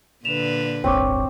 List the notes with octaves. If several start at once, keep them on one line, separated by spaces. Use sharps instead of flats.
A#2 D3 B4 E7 F7
D#1 G#1 C4 C#5 C#6 D6